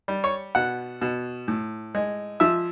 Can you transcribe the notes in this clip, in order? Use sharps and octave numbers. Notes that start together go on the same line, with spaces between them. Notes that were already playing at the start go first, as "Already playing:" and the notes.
G3
C#5
B2 F#5
B2
A2
G#3
F3 E5